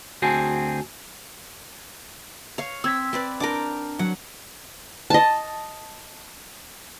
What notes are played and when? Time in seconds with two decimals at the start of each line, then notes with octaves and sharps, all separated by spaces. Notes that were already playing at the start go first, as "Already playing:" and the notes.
0.22 D2 C4 F#4 G#4 G#5 A5
2.58 C#5 F5
2.84 C4 E6 G#6 B6
3.13 C4 B4 D5
3.40 D4 A#4 G5 D6
3.99 F#3 F#5
5.10 D#5 A5